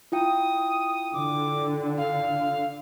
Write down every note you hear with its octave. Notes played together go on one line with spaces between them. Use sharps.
E4 F4 G5 D#6
D3 D6
F5